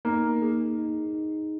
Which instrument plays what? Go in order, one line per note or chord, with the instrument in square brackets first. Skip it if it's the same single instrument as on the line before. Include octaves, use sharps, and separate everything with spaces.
[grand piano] A#3 [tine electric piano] D#4
[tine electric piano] G#4
D#4
D#4